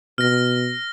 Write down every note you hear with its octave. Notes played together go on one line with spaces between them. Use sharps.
B2 F6 A#6